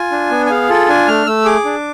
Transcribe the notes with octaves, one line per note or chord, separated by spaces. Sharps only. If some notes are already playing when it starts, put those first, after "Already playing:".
Already playing: F4 G#5
D4
B3
G#5
G#4 F5
F4 A4
D4 G#5
A3 F6
A3 E6
G#4 D6
D4